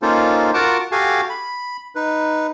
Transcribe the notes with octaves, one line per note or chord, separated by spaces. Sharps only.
A#3 C#4 D#4 F4 A4 C5
F4 F#4 A#4 F#5 A5 D6
F#4 G4 A4 F5 G#5
B5
D#4 B4